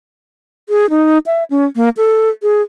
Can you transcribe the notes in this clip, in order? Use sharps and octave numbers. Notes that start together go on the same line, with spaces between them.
G#4
D#4
E5
C#4
A#3
A4
G#4